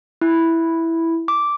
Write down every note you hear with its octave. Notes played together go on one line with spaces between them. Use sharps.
E4
D6